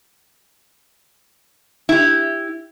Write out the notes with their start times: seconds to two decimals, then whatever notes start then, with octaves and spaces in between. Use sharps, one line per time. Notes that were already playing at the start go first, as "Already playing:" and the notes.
1.89 E4 G4